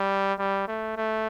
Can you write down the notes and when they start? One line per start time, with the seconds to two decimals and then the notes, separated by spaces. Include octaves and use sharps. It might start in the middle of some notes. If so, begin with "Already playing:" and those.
Already playing: G3
0.39 G3
0.68 A3
0.97 A3